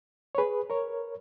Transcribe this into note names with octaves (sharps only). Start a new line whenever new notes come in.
C#5
G#4 B4
A#4 C#5